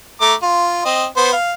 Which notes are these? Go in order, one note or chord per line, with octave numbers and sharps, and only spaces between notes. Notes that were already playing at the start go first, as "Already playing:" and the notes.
A3 A#5 D6
F4
C4 D#5
B3 C5
F5